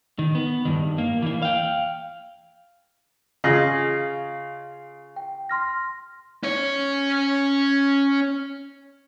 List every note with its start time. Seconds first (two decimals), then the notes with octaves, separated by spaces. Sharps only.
0.19 D#3
0.35 B3
0.65 G2 D#3
0.98 A#3
1.22 E3 A#3
1.42 F5 G5
3.44 C#3 F4 G#4 D#5 A#6 F#7
5.16 G5
5.49 C6 F6 A#6
6.43 C#4 C#5